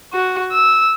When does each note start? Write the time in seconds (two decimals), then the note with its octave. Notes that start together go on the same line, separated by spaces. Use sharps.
0.13 F#4
0.52 E6